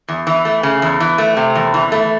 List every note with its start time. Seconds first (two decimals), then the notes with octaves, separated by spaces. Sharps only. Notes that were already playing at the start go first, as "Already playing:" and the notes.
0.08 E2
0.27 E3
0.45 A3
0.63 C#3
0.82 E2
1.00 E3
1.18 A3
1.37 C3
1.55 E2
1.74 E3
1.92 A3